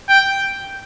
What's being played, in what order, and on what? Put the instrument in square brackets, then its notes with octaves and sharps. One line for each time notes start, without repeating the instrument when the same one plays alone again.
[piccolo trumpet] G5